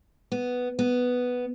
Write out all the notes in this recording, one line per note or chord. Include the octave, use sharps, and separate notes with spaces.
B3
B3